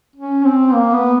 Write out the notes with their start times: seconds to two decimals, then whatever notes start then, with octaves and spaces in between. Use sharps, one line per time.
0.16 C#4
0.45 C4
0.73 A#3
0.93 B3